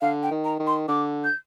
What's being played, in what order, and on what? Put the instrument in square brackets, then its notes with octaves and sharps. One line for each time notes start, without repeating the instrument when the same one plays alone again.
[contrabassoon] D3 [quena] F5
[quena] G5
[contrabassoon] D#3
[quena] A#5
[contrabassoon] D#3
[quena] C6
[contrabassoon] D3 [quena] D6
[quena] G6